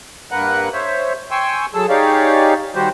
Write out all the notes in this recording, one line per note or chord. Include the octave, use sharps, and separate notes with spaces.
G2 A#3 A#4 B4 F#5 F#6
C5 C#5 E5
G5 G#5 C6 C#6 E6
F#3 G#4 A4 A5 E6
D#4 G4 G#4 C#5 D5 F5
D#3 G3 F#4 G4 C5